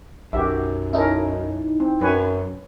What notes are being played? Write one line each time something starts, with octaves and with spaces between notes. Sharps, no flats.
B1 F#2 F#4 G4 E5
C#4 D#4 E4 A4 A#4
C4
F#2 B4 C#5 G#5